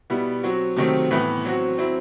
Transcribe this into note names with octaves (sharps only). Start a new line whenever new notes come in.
B2 G3 B3 E4
F#3 C4 F#4
C3 D#3 F#3 A3 C4
A2 E3 B3 E4
F#3 C4 F#4
F#3 C4 E4